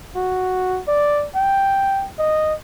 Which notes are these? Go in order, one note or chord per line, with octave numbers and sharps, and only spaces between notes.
F#4
D5
G5
D#5